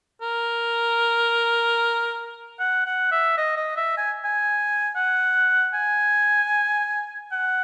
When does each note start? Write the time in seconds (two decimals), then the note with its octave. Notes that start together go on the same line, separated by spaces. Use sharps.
0.22 A#4
2.59 F#5
2.86 F#5
3.11 E5
3.38 D#5
3.57 D#5
3.77 E5
3.97 G#5
4.25 G#5
4.96 F#5
5.74 G#5
7.32 F#5